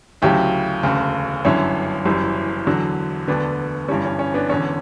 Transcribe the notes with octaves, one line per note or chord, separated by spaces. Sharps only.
D2 C#3 F#3 E4 G4
E1 D2 C#3
G1 F#2 D3 C#4 E4
F#1 F#2 E3 G3
E2 D3 F#3
E1 D2 D3 B3 D4
G1 G2 E3 G3 C#4
C#4
C#4
B3 D4
E1 E2 D3 C#4